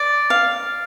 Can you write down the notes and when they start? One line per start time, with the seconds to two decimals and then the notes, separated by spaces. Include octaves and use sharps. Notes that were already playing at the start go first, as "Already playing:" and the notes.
Already playing: D5
0.30 F5